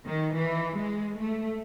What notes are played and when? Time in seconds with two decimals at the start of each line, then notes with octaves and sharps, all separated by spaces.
0.08 D#3
0.36 E3
0.78 G#3
1.21 A3